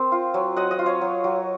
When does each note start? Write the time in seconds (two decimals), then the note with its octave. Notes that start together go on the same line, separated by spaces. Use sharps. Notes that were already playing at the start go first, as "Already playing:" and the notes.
Already playing: C4 A#4 C5
0.12 F4
0.34 F#3
0.56 F#3 D#5 F#5
0.71 D#5 F#5
0.79 F4
0.86 C#5 F5
1.01 F#3
1.24 F#3